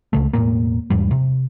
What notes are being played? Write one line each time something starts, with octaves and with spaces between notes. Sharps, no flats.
C#2 C#3 A3
E1 A#1 A2 A#3
E2 G#2 G3
C3